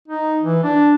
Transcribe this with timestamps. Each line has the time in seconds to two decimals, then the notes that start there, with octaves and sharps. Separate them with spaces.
0.08 D#4
0.43 E3
0.64 D4